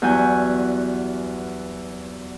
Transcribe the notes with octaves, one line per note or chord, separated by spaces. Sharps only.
E2 G2 F#3 F#4 G#5 G6